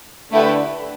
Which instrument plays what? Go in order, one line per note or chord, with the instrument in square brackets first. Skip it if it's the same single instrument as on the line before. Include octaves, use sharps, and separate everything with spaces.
[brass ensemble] D3 [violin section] A3 E4 G4 B4